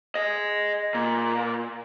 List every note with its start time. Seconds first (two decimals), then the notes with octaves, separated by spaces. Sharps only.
0.15 G#4 D#5
0.95 A#2